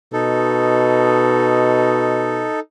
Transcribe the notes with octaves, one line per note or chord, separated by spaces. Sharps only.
B2 D#4 A4